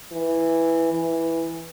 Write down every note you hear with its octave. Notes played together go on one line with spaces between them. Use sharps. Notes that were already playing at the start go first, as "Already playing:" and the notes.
E3
E3